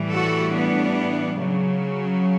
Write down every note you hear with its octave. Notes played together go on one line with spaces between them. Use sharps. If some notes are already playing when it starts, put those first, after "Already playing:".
Already playing: A2 E3 G3
F#4 A4
B3 D4
C#3 F#3